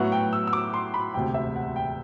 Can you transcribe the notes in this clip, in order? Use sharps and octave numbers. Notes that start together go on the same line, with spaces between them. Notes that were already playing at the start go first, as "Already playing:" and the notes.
Already playing: A2 F#3 B3 E4 F#5
G5
E6
E6
D6
C6
B5
E1 D2 C3 G5
E5
F#5
G5